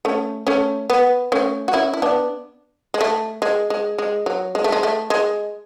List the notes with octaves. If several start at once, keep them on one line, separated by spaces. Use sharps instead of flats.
A3 C#4
A3 C#4
B3
A3 C#4
F#4
C#4 E4
E4
B3 D4
G#3
A3
G#3
G#3
G#3
F#3
G#3
A3
G#3
A3
G#3